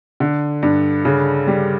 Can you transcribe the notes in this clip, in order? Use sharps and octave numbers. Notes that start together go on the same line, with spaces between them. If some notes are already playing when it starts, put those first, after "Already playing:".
D3
G2
C#3
G3